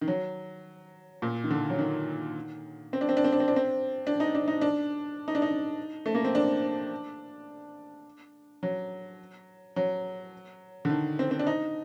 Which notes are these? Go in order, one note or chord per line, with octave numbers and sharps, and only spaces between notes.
D#3
F#3
A#2
D#3
D3
F#3
D#3
C4
D4
C4
D4
C4
D4
C4
D4
C4
D4
D#4
D4
D#4
D4
D#4
D4
D#4
A3
A#3
C4
D4
F#3
F#3
D3
D#3
C4
C4
D4
D#4